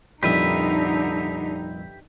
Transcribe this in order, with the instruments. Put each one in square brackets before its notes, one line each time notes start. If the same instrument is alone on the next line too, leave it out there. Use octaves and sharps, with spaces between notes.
[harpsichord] C2 F2 A#2 [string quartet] D3 [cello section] D#4 [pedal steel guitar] G4 B4 E5